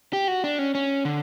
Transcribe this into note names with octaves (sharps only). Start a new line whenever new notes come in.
G4
F#4
D4
C#4
C#4
D3